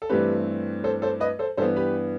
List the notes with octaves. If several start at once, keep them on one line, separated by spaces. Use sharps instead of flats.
A4
G2 E3 A3 C4 G4 B4
A4 C5
A4 C5
B4 D#5
A4 C5
G2 E3 B3 A4 C5
G4 B4